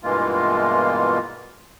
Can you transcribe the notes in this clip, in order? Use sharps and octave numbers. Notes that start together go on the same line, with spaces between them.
G2 B2 E3 G#3 A#3 F4